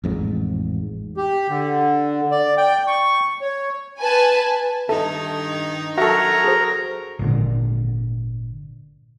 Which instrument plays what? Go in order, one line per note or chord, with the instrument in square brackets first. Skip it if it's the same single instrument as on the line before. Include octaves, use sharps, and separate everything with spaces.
[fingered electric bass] A1 F2 G#2
[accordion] G4
D3
D5
G5
C#6
C#5
[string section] B4 G#5 A5
[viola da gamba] G2 D#3 D#4 [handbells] A4 E5 A5
[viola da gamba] F#3 C#5 [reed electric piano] F#4 A4 [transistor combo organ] A#4 [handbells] E5 A#6
[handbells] G#4 C5
[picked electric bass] G#1 A#2 D3